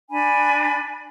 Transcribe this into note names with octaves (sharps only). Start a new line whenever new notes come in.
D4 G#5 B5